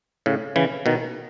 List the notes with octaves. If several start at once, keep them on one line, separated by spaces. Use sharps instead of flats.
A2 C#3
C#3 E3
B2 D#3